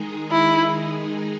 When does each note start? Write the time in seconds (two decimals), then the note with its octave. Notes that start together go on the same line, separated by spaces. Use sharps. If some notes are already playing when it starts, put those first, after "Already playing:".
Already playing: D#3 G#3 D#4 G#4
0.31 E4